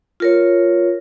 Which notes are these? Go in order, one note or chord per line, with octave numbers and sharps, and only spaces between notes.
F4 A#4 C#5